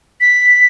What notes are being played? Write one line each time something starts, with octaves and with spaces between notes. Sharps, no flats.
B6